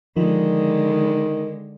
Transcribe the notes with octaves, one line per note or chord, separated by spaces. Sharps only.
D3 D#3 F3 G#3